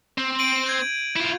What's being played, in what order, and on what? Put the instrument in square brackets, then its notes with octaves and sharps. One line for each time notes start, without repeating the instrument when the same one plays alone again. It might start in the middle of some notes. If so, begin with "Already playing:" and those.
[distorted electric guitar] C4
[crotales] D7 D#7 F#7
G6 G#6
[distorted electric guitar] E4 F4